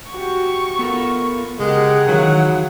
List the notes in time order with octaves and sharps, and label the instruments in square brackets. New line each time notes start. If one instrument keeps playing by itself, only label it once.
[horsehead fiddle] F#4 G4 [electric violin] C#6
[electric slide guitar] B3 A4 A#4 [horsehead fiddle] F4
[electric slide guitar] C#3 [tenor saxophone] G#3 [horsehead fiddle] G4 A#4 [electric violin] G#4 F#5
[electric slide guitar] D#3 E3 [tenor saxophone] F#3 [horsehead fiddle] F5